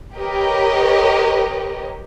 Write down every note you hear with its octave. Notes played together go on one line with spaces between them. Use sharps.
G4 A#4 B4 C#5 D#5